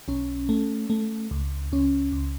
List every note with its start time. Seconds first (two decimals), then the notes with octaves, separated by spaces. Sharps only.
0.08 B1 C#4
0.49 A3
0.90 A3
1.31 C#2
1.72 C#2 C#4
2.12 C#2